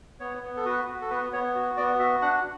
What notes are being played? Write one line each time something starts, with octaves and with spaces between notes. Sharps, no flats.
B3 C#5
B3
A4
F#4 B4
F#4
A4
B3 B4
B3 C#5
F#4
B3 D5
F#4 E5
D4 F#5